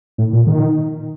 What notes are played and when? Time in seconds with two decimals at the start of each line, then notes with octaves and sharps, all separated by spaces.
0.18 A2
0.33 A#2
0.47 D#3